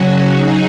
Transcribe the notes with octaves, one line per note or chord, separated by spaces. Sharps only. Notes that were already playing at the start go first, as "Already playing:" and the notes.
Already playing: C#3 F#3 C#4 F#4
F#3 D#4 G#4